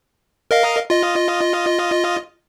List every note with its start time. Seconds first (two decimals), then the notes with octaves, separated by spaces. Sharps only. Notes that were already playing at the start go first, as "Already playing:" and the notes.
0.51 A#4 D#5 F5
0.90 F4 D#5